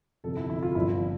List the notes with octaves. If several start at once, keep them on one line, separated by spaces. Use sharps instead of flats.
G1 F2 C3 F3 A4
E4
E4
F4
G1 G2 D3 F3 E4